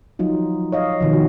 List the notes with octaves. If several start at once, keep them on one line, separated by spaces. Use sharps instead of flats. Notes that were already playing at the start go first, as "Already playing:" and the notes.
F3 F#3 D#4 F4
C#5 D#5 F5
B2 D#3 F3
F#4